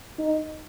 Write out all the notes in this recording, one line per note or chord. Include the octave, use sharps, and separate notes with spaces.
D#4